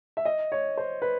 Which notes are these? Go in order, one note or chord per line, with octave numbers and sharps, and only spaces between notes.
E5
D#5
C#5
C5
B4